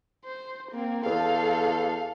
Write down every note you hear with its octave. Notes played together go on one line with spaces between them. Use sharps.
C5
A#3 C4
E2 A4 F5